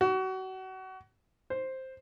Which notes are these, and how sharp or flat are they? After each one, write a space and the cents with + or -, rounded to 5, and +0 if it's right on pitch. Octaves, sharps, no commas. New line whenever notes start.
F#4 +30
C5 +5